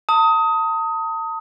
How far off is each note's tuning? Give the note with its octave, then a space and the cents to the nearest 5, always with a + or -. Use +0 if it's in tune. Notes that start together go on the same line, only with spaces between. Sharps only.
A5 +40 D#6 +20